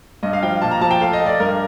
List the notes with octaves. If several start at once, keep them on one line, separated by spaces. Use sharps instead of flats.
G2 D#5
F5
F3 G5
A#2 A5
A#5
F3 A5
G5
A3 F5
D#5
A3
D5
G2 A#4